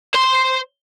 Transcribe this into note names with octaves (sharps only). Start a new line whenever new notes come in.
C5 C6